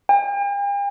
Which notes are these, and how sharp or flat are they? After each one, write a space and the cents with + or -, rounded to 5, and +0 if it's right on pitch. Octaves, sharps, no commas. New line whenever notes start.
G5 +45